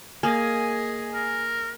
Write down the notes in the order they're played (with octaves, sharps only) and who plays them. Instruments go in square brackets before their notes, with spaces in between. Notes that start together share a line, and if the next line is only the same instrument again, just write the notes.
[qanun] A#3 [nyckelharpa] G#4 D#5 [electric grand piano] G#5
[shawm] A#4